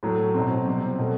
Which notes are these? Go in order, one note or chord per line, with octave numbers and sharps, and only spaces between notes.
A2 F#3 A3
B2 F#3 C4
C3 G3 C4
B2 F#3 A3